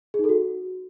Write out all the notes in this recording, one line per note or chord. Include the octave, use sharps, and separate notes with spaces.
G#4
D#4
A4
F#4